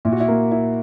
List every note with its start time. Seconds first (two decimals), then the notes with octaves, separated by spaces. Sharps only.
0.05 A#2 E4
0.12 F#4
0.20 E4
0.28 A#3
0.51 E4